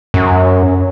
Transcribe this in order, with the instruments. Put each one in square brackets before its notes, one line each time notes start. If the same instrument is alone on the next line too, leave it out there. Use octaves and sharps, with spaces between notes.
[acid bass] F#2